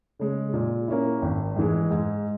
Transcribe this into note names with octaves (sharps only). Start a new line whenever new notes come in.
C#3 G#3
A#2
A#3 C#4 E4
G#1
G#2 E3 G#3
G#2